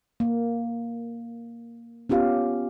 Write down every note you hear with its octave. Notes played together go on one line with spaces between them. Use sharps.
A#3
B3 C#4 F4 G4 F5